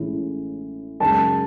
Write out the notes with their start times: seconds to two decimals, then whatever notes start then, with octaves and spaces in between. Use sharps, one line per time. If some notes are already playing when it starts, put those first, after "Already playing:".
Already playing: A1 A2 G#3 C#4 E4
1.00 F#2 C#3 G#3 A5